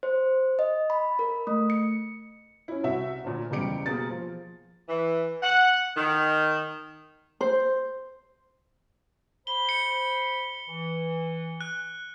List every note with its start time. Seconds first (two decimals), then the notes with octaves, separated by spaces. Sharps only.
0.03 C5
0.59 D#5
0.90 B5
1.19 A#4
1.47 A3
1.70 C#7
2.68 C#4 E4
2.84 C2 F#4 E5
3.24 D2 A#2
3.51 F#1 E2 G3 G4 C#7 D7
3.86 B2 A#3 G#4 A6
4.10 F3
4.88 E3
5.42 F#5
5.96 D#3
7.41 C5
9.47 C5 B5 G7
9.69 C#7
10.68 E3
11.61 F#6